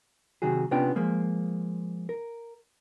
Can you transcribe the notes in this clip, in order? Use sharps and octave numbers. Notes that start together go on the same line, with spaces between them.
C3 D#3 F#3 F#4 G#4
C3 B3 C#4 D4 F4 G5
F3 G#3 A#3
A#4